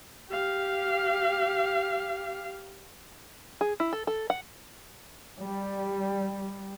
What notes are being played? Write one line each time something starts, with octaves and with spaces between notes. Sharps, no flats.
G4 F5
G#4
E4
A4
A4
F#5
G3